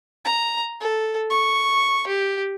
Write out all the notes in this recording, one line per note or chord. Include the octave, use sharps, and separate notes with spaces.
A#5
A4
C#6
G4